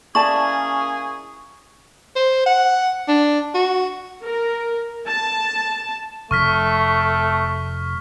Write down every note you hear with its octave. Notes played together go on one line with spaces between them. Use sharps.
A#3 C#4 E4 G#4 D5 A5 C#6
C5
F#5
D4
F#4
A#4
A5
F1 A3 C#6 F6 B6